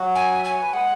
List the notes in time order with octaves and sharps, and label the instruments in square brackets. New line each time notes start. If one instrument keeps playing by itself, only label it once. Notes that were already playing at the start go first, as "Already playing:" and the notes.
Already playing: [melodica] F#3 F#4
[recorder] G#5
[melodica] E5
[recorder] G#5
[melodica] C#5
B4
[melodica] G#3 G#4 [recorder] F#5